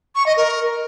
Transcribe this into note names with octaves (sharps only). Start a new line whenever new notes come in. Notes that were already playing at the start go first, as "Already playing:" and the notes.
C#6
D#5
A#4